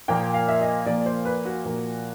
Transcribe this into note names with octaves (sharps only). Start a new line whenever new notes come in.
A#2 F3 A#3 G5
F5
E5
D#5
A#2 F3 A#3 D5
C5
B4
F#4
A#2 F3 A#3